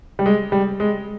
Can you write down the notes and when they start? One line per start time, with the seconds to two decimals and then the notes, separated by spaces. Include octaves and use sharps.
0.19 G3
0.26 G#3
0.52 G3
0.80 G#3